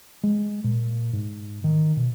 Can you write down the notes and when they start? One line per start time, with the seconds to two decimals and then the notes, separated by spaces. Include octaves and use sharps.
0.23 G#3
0.64 A#2
1.13 G#2
1.64 D#3
1.97 B2